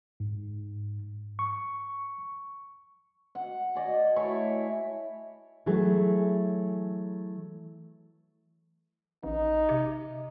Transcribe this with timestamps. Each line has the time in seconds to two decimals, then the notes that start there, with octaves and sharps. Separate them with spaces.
0.20 G#2
1.39 C#6
3.35 F#5
3.75 G#4 D5 D#5
4.16 A3 E4 G#4 C#5
5.66 E3 F#3 A3 G#4
9.24 A1 D#4
9.69 C3